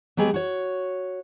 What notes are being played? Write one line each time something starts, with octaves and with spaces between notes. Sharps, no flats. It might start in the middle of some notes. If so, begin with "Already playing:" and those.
F#3 G#3 B3 G4 G#4
F#4 C#5